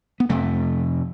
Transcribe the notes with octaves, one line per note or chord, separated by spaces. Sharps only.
B3
F2 C3 A3